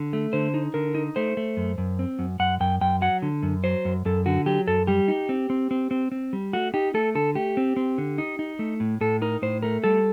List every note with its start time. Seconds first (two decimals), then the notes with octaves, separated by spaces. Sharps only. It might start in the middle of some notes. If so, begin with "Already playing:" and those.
Already playing: D3
0.13 A3
0.33 D3 C5
0.54 D#4
0.74 D3 A#4
0.95 D#4
1.16 A3 C5
1.37 A3
1.57 F#2
1.78 F#2
1.99 C4
2.19 F#2
2.39 F#2 F#5
2.60 F#2 G5
2.81 F#2 G5
3.02 F#3 F#5
3.22 D3
3.43 F#2
3.64 F#3 C5
3.85 F#2
4.05 F#2 A4
4.26 D3 F#4
4.46 F#3 G4
4.68 F#2 A4
4.87 G3 G4
5.08 D#4
5.29 C4
5.50 C4
5.71 C4
5.91 C4
6.12 C4
6.33 G3
6.53 A3 F#4
6.74 D#4 G4
6.94 A3 A4
7.15 D3 A4
7.35 A3 G4
7.57 C4
7.77 C4
7.98 D3
8.18 D#4
8.39 D#4
8.59 A3
8.80 A2
9.01 A2 A4
9.22 D#4 A#4
9.42 A2 C5
9.63 A3 A#4
9.84 G3 A4